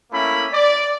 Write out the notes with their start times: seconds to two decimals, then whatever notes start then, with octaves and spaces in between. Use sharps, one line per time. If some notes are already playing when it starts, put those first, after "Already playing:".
0.11 A3 A#3 C#4 E4 B5
0.52 D5